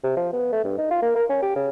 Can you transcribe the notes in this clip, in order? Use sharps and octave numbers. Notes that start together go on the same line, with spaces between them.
C3
F3
B3
A3
G2
D#4
F4
A#3
A#4
C#4
G4
C#3